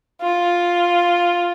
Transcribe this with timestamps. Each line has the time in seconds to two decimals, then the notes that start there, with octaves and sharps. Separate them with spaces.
0.22 F4